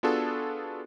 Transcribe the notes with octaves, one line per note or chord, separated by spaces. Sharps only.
B3 D4 F4 F#4 G#4 A4